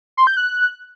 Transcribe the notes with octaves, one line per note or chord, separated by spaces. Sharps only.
C6
G6
F#6